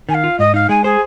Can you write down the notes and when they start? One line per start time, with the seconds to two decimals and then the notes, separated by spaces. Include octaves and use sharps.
0.09 D#3 G#5
0.14 F5
0.24 F4
0.39 G#2 D#5
0.54 D#4 F5
0.69 G#3 G#5
0.84 G#4 C5